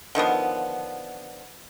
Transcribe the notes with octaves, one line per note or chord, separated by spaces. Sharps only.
D3 D#3 F3 B3